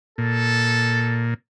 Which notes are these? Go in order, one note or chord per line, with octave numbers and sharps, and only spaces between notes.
A#2 A4